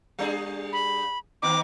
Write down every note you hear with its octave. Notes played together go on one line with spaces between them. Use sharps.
G3 D4 G#4
B5
D#3 B3 D#4 D6